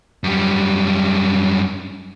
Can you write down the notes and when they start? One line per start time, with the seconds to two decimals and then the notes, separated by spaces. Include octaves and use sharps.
0.24 F#2 G3